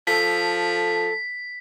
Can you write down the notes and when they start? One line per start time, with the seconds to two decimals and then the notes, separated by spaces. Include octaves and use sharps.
0.07 F3 A4 B6